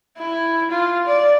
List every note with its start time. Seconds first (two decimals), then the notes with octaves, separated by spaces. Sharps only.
0.19 E4
0.71 F4
1.06 D5